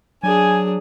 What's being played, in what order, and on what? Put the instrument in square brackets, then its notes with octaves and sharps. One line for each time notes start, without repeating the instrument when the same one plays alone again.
[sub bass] F#3 [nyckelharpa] D4 G#4 [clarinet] G#5